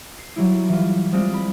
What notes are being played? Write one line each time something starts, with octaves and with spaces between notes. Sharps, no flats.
C7
F#3 G3 E4
E3 F4
G3 G#3 C4 F4
B5